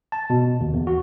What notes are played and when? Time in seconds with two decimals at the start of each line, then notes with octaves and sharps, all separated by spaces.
0.12 A5
0.30 B2
0.61 D#2
0.74 E2
0.87 F#4